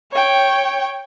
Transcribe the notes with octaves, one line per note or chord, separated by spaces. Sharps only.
C#5 G5